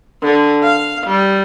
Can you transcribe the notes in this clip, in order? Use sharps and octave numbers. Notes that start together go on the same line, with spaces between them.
D3
F5
G3